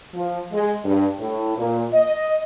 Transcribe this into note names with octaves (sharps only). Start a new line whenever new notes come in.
F3
G#3
G2
A2
A#2
D#5